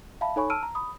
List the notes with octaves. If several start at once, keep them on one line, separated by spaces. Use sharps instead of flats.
E5 F5 A5 B5
D#4 A4 C#5 G#5 B5 C#6
A5 E6 F6 D7 D#7
A#5
B5 D#6